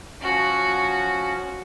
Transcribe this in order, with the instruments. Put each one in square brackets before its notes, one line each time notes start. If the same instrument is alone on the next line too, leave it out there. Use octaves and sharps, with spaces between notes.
[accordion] F3 C#4 [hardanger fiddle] F#4